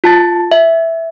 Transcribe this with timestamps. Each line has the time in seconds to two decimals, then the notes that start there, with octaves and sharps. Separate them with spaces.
0.04 F4 A5 A6
0.52 E5